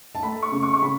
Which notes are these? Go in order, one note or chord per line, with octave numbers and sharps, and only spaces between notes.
A5
A3 B5
C#6
C#3
C#6
C#6
C#3 B5